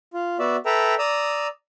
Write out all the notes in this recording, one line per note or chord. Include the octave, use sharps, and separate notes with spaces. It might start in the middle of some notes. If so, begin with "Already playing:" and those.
F4
B3 F#4 D5 E5
A4 B4 E5 G5 A#5
D5 A#5 D#6 E6